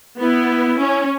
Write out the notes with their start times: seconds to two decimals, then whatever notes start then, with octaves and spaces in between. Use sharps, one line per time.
0.20 B3 E4
0.80 C#4